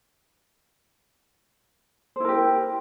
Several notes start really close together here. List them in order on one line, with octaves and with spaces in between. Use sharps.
C5 E4 A#4 G4